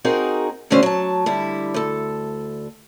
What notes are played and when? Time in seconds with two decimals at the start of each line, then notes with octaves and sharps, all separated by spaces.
0.04 C4 D#4 F#4 G#4 A#4
0.70 E2 D3 A3 C#4 F#4 C5
0.83 F#3 A5
1.26 D3 G3 E4
1.74 D2 A4